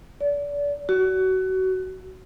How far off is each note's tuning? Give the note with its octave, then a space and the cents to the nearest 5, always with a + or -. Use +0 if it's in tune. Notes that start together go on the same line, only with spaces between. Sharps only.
D5 -30
F#4 +25